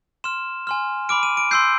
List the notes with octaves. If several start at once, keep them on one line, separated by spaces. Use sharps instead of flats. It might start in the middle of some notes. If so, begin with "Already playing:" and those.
C6 F6 E7
G#5 C6 F6
B5 D6 F6 D7
D#7
D7
C6 E6 G6 C7